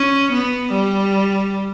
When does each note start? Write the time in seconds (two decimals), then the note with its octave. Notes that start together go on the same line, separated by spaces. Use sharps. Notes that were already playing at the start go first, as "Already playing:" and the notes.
Already playing: C#4
0.33 B3
0.73 G3